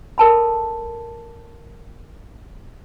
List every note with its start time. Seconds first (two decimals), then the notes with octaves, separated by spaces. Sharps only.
0.18 A4 A#4 A5 B5